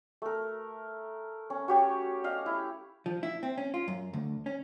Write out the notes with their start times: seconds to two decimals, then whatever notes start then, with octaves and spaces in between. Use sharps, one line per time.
0.22 A3 A#4
1.50 C#4
1.68 F#4 G4 C#5
2.24 D#5 F5
2.46 E4
3.06 F3
3.23 E4
3.43 C4
3.58 C#4
3.74 F4
3.88 F#2
4.13 D2
4.46 C#4